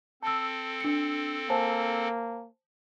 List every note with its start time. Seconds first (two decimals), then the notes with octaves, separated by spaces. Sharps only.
0.23 C4 A4 A5 E6
0.80 D4 C#7
1.50 A#3 C5 G#5 A5